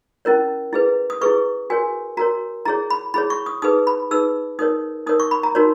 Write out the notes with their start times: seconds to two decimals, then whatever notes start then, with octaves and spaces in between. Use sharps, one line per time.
0.25 C#4 E4 A#4 C#5
0.73 E4 G#4 B4
1.10 D#6
1.21 E4 G#4 B4 C#6
1.70 F#4 A#4 C#5 G#5
2.17 F#4 A#4 C#5 A#5
2.65 E4 G#4 C#5 A#5
2.90 B5
3.14 E4 G#4 C#5 B5
3.30 C#6
3.46 D#6
3.62 D#4 G#4 B4 D#6
3.87 B5
4.11 D#4 G#4 B4 E6
4.59 D#4 A#4 C#5 D#6
5.07 D#4 A#4 C#5 D#6
5.20 C#6
5.31 B5
5.43 A#5
5.55 D#4 F#4 A#4 C#5